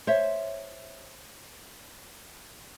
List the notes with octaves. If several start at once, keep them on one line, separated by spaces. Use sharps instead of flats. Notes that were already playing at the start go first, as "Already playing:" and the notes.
C5 C#5 E5